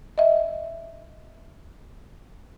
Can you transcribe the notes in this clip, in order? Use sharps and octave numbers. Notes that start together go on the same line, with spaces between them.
D#5 E5